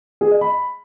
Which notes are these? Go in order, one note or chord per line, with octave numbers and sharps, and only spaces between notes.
G#4
D#5
B5